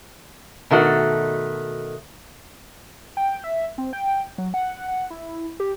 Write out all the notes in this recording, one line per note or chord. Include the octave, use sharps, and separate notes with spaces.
B2 D#3 A3 F#4
G5
E5
C4
G5
F#3
F#5
F#5
E4
G4